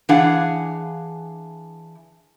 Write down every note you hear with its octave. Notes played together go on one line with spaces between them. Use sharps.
E3 D4 G#4 F5 F#5